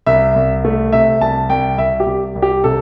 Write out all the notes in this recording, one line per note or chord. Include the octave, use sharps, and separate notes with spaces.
C2 E5
C2
A3
C3 E5
C2 A5
C2 G5
C2 E5
G4
C2
C2
G4
C3 A4